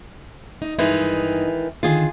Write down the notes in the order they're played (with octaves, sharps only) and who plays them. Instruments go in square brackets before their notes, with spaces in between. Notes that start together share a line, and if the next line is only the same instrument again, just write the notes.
[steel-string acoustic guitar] D#4
[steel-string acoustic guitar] G2 D#4 [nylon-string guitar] D#3 E3 G#3
[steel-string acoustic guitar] D3 D#3 [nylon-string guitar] F4 G#4